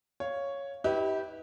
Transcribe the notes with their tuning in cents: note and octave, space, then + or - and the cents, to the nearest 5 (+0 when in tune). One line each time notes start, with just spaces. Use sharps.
C#5 +0 F5 +0
E4 -45 G4 -10 B4 -5